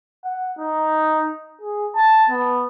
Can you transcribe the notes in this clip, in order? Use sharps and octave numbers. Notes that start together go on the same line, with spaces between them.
F#5
D#4
G#4
A5
B3